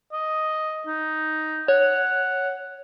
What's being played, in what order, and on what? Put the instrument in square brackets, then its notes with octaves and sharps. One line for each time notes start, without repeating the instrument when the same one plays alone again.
[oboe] D#5
D#4
[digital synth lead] C#5 [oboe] F#5